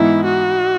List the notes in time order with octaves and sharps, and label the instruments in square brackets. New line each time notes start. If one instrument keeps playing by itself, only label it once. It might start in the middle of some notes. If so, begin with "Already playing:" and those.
Already playing: [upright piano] G#2 E3 B3 D#4 [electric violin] E4
[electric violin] F#4